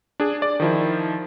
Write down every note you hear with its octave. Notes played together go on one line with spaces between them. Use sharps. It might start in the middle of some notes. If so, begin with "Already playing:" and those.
D4 G#4
D5
D#3 F3 E4